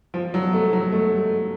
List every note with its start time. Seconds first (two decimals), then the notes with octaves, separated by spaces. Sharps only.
0.14 F3
0.34 F#3
0.53 A3
0.73 F#3
0.92 A3
1.19 A3